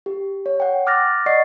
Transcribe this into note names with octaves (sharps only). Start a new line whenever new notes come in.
G4
C#5
F#5 G5
D6 F6 F#6 A6 A#6
D5 D#5 F#5 C#6 A6 C7